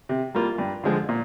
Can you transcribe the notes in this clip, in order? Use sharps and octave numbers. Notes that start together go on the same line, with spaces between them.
C3
G3 A#3 F4
G2
D3 F3 G#3
A#2